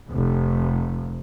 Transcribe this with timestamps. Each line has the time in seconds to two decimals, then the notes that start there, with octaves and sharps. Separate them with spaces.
0.11 F1